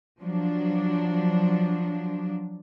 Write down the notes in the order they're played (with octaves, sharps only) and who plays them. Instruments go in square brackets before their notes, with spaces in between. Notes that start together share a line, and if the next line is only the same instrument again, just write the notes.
[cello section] F3 F#3 D4